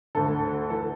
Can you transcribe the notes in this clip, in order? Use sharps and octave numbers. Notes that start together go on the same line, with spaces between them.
D2 D3 A4
E3 A4